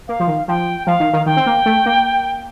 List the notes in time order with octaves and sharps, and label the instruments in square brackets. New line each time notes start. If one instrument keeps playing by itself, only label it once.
[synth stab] A#3 [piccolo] F5
[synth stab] F3
D#3
[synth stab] F3 [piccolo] G5
[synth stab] F3 [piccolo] F5
[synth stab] D#3
D#3
[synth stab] D#3 [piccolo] G5
[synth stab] C4
A#3
A3
A#3